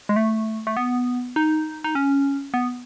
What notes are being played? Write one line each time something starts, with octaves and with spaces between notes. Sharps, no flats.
G#3
A3
A3
B3
D#4
D#4
C#4
B3